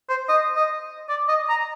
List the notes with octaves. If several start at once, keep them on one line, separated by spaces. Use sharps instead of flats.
C5
D#5
D#5
D5
D#5
A#5